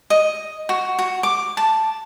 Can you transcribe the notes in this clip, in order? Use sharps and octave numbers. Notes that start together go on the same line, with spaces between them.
D#5
F#4
F#4
D6
A5